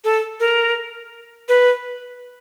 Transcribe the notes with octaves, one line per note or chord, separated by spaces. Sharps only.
A4
A#4
B4